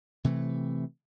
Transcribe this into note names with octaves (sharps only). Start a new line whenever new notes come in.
C3 E3 A3